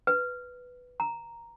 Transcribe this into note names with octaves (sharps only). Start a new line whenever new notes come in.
B4
A#5